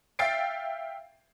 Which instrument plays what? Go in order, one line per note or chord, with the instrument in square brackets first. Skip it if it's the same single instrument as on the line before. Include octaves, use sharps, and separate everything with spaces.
[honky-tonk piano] E5 F5 G5 A6 C7 D7